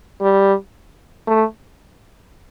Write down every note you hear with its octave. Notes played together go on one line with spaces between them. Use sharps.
G3
A3